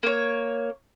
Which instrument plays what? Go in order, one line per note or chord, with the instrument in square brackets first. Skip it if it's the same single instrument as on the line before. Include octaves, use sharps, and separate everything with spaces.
[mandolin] A#3 C#5